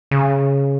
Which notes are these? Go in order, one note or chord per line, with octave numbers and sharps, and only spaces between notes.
C#3